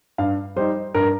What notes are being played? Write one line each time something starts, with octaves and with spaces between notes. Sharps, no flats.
G2 F5
G3 D#4 C5
G2 A#4